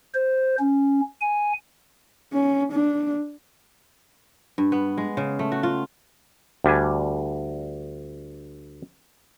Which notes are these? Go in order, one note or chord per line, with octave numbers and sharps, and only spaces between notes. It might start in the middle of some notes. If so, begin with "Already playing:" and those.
C5
C#4
G#5
C#4
D4
G2
B3
G#3
C#3
A3
F#4
F4
D2 G3 D4 G#5